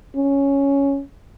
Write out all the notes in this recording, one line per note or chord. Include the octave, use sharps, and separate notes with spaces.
C#4